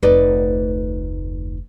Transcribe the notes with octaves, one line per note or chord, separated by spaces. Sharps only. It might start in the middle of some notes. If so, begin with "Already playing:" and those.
F1 D2 D#4 B4 D5